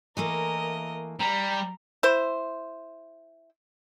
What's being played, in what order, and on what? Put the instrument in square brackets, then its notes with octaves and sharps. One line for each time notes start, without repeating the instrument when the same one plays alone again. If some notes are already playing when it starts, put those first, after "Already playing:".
[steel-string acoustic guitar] E3 A3 A#3 [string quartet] A#4 D#5
[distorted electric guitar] G3 [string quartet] A#5
[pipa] E4 C5